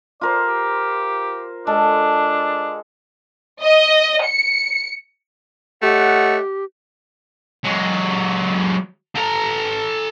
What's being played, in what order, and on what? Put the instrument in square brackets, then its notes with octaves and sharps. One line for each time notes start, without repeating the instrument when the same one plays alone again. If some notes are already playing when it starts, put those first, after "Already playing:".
[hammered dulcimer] F4 A#4 C5 [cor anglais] D5
[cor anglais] G4
[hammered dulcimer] G#3 A4 [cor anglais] D4
[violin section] D#5
C#7
[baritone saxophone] A3 [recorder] G4 [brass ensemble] C#5 D#5 F#5
[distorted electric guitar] F#3 G#3
A4 A#5